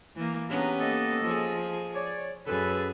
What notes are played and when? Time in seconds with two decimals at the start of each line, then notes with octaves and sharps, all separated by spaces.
0.16 E3 A#3
0.49 B3 C#4 D4 G4 G#4 A#5
0.79 A#3 A4 D#5
1.24 F3 G#4
1.95 C#5 D5
2.47 F#2 G#4 A4 B4